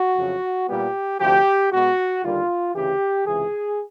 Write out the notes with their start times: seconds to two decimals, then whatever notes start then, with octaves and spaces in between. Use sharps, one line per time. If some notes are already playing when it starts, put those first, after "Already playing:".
Already playing: F#4
0.16 F2 C#3 F#3
0.68 A#2 G3 B3 G4
1.20 D2 C3 F3 G4
1.71 B2 G#3 B3 F#4
2.23 D#2 D3 G3 A#3 F4
2.75 D2 C#3 E3 G4
3.26 C#2 C3 E3 G#4